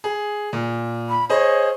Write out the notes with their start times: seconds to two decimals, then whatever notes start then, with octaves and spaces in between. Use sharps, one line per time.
0.04 G#4
0.53 A#2
1.09 B5
1.29 G#4 C5 C#5 D#5